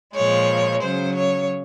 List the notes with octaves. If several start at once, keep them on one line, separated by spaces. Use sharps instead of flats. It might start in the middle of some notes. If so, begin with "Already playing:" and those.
A#2 F3 G#3 C#5
C#3 F#3 C5
C#5